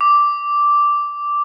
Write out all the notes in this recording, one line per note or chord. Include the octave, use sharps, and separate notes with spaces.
D6